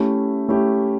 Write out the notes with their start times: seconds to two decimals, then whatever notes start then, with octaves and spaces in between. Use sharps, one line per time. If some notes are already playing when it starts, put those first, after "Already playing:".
Already playing: A3 C#4 E4 G4
0.49 A3 C#4 E4 G4